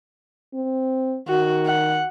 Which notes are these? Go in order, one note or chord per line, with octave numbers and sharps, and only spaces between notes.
C4
D#3 F#4
F#5